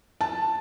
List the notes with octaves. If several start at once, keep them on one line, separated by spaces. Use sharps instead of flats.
A5